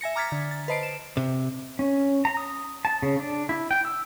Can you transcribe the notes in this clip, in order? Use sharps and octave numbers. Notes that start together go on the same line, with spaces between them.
E5 G#5 A#6 C#7
A#5 D6 F6 G#6 A6 B6
D3
A6
B4 C5 D#5 A5 C7 D7
E7
C3
C#4
A#5
D#6
A5
C#3
D4
E4
G5
E6